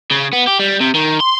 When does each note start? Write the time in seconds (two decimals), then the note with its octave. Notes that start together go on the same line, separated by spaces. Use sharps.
0.11 C#3
0.33 B3
0.47 G4
0.59 G3
0.80 C3
0.94 D#3
1.20 C6